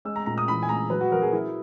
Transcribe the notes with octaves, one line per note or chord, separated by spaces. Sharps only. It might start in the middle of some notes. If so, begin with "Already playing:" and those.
G#3 E6
A#5
A#2 A#5
D#6
E3 B5
G#5
G#3 A#5
F#3 B4
F#4
F#3 A#4
G#4
F#3 E4